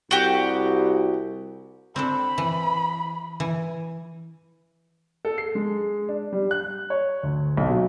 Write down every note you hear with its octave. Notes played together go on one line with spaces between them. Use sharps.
C2 F#4 G4
C4 D4 A4 B5
E3
E3
A4
C7
G#3
D4
G3
F#6
C#5
D2
B1
F#3